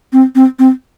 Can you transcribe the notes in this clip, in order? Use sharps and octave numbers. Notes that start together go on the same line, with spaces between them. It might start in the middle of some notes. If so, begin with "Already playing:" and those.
C4
C4
C4